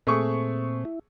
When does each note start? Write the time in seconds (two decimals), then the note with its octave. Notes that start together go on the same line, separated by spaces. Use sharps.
0.07 A#2 A3 C4 G#4 C#6
0.85 E4